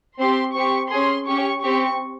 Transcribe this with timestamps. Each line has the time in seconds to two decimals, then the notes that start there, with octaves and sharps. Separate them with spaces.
0.19 C4 G4 C6
0.54 C4 G4 C#6
0.91 C#4 G#4 C6
1.27 C#4 G4 C#6
1.63 C4 G4 C#6